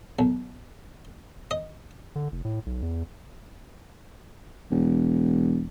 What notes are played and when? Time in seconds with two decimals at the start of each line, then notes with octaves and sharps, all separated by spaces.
0.19 B1
1.51 D#5
2.15 D3
2.32 F1
2.45 A2
2.66 B1
2.82 E2
4.71 E1